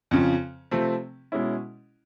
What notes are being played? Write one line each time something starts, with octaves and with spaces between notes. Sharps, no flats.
F2 C#3 F3
C3 F3 A3 C4
B2 G#3 C#4 E4